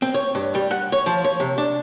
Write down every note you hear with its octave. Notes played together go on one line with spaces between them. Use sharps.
C4
C#5
G2
G3
F#5
C#5
F3
C#5
C3
D4